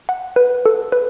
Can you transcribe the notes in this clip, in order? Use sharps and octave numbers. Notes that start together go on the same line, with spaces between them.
F#5
B4
A4
B4